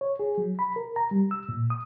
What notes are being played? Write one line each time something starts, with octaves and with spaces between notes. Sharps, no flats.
C#5
G#4
F#3
B5
A#4
A#5
G3
E6
A#2
D#6